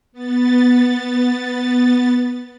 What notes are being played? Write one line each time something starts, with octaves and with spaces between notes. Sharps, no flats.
B3 A6